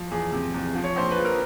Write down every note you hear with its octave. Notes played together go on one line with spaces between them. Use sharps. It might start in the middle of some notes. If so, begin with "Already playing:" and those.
Already playing: F3
E2 G#4
C3
E2
F3
C#5
A#1 C5
B4
F3
A#4